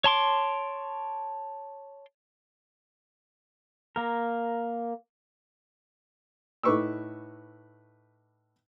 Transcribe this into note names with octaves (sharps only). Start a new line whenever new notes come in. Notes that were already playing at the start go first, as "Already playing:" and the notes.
C#5 A5 C6 D6
A#3 A#4
A2 D#4 B4 C#6 D6 E6